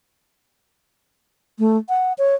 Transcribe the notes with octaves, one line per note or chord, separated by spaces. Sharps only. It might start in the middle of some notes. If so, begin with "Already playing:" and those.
A3
F#5
C#5